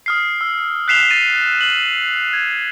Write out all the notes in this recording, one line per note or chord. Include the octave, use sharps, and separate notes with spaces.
D#6 F6 C7
E6
F#6 B6 C7 E7 F7 G7
A6 D#7
F#7
G#6